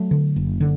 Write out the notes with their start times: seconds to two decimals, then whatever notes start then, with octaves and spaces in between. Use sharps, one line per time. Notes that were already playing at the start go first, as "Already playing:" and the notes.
Already playing: F#3 A3
0.11 D3
0.36 F#1
0.61 D3